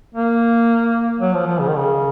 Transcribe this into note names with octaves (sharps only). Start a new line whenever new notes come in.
A#3
F#3
F3
F3
C#3
D#3
C#3